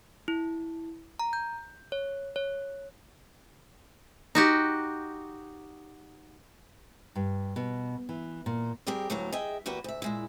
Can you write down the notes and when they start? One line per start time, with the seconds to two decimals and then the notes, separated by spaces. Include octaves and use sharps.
0.28 E4
1.19 A#5
1.33 G6
1.92 C#5
2.36 C#5
4.35 D#4 F#4 G4
7.15 G2
7.56 B2
8.09 E3
8.46 A#2
8.87 G3 C4 G4 G#4 A#4
9.10 D2 A2 F#3 A#3 B3 A#5
9.32 G#4 D#5 E5 G5
9.66 E2 A#3 F#4 G4 B4
9.84 D2 E5
10.02 A#2 G#3 E4